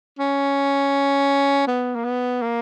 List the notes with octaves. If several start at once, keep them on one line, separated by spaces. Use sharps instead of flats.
C#4
B3
A#3
B3
A#3